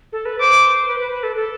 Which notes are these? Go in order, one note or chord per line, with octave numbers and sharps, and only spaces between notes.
A4
B4
C5 D6
B4
B4
B4
A4
A4